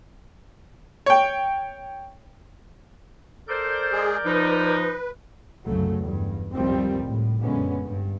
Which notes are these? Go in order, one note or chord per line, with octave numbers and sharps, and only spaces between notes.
C#5 G5
A4 A#4 C5 D5 G6
G#3 G#4
F3 D#4 B4
C2 F#2 C#3 F#3 A3
E2 G2
C#2 F#2 D#3 F3 G3 C4
A2
F#2 A#2 D3 G#3 B3 C#4
G2